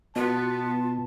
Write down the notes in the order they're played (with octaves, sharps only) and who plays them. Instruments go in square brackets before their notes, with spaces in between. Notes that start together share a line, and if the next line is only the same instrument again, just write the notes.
[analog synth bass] B2 [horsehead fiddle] B3 [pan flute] F4 [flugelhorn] A5